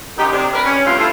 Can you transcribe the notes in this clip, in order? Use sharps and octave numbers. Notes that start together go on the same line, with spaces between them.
F#2 D#4 G4
C3 D4
A#4 B4
C#4
D2 G2 A3 B3 C4 F4
A3 E4 F4